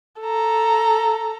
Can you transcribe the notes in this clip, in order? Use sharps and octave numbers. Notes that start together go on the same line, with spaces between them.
A4 A#5